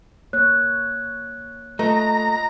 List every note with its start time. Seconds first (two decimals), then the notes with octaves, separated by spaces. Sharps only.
0.33 A#3 C#5 F#6
1.79 A3 F4 B4 D#5 A#5